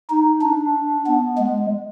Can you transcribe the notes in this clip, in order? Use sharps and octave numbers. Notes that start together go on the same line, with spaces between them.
D#4
D4
B3
G#3